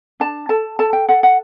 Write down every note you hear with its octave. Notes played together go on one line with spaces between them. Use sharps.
D4 A5
A4 A5
A4 A5
G5
A4 F#5
F#5